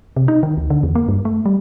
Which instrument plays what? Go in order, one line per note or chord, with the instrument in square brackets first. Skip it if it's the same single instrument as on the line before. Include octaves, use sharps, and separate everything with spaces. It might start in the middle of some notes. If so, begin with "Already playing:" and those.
[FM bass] C3
D#4
D#3
D2
D3
E2
A#3
G2
A3
G3